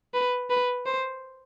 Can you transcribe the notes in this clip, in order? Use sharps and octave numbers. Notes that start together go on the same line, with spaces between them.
B4
B4
C5